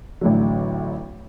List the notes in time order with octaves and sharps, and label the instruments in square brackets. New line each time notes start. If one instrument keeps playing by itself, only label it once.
[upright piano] A1 A2 D3 F#3